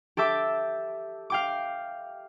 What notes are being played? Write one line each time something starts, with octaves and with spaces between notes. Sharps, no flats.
G4 A4 E5 D6
F5 G5 D6